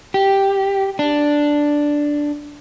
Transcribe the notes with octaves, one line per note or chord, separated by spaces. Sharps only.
G4
D4